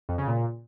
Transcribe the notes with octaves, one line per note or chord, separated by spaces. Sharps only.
F2
C#3
A#2